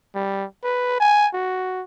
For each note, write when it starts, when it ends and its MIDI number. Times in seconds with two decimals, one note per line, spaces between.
0.15 0.45 55
0.64 1.00 71
1.00 1.28 80
1.34 1.83 66